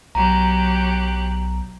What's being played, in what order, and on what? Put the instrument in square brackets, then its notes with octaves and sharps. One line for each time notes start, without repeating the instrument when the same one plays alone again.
[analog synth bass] B1 [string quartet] F#3 G4 F#6 [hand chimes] A#5